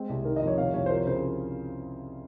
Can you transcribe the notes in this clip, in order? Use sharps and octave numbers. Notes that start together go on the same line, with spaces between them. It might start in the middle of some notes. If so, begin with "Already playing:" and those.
Already playing: G#3 C4
C2
D#3 A#4
D#5
F2
C#5
C2 F5
C2 C#5
C5
F3 A#4
C#3 C5